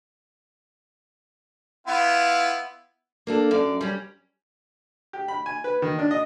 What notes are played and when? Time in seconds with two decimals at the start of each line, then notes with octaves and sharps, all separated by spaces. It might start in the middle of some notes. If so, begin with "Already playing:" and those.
1.87 B3 E4 F4
3.27 A#3 D4 A4
3.51 F#2 D5
3.81 G3 C#4
5.13 G4
5.28 B5
5.46 G#5
5.64 B4
5.82 D#3
5.99 D4
6.11 D#5